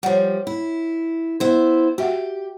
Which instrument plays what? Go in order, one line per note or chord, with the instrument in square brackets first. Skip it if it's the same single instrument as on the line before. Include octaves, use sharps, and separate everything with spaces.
[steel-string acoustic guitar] F3 G3 [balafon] C#5 F#5
[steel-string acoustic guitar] E4
B3 E4 C5
[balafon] F#4 E5 F#5 [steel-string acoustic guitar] G4